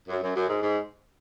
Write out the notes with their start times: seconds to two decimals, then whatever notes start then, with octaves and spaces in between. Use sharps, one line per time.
0.08 F#2
0.21 F#2
0.34 F#2
0.48 G#2
0.62 G#2